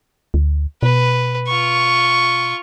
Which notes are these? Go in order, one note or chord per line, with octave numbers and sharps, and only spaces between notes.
D2
B2 B4
F4 C#6